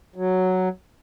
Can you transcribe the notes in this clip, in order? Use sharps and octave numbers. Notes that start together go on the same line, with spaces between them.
F#3